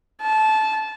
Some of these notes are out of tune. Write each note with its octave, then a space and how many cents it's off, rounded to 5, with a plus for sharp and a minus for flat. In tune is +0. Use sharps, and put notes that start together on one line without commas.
A5 -20